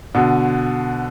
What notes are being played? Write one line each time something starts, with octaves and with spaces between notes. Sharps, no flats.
B2 D3